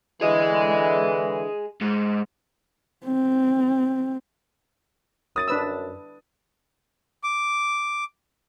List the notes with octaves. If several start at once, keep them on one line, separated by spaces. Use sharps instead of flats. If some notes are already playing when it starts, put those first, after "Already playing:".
D3 E3 G#4 D#5
G#2
C4
F#2 D#6 A6 D#7
D4 B4 E6
D6